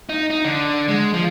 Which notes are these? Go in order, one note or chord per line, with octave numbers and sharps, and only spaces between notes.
D#4
D#4
D3
G#3
F3